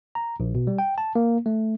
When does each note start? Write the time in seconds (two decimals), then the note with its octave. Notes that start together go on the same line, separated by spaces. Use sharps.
0.15 A#5
0.40 A#1
0.55 B2
0.67 G3
0.79 G5
0.98 A5
1.15 A#3
1.46 A3